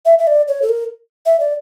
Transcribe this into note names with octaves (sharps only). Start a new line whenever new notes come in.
E5
E5
D5
C#5
A4
A#4
E5
D5